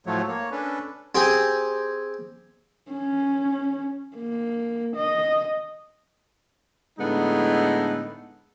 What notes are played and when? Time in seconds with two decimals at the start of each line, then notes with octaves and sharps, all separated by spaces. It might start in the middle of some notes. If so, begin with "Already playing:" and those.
0.06 A2 F3 F#3 A3 C#5
0.28 A#3 C#5
0.51 C#4 D4 A4 B4
1.15 C4 G4 G#4
2.90 C#4
4.17 A#3
4.96 D#5
7.00 A2 D3 G#3 B3 D#4 E4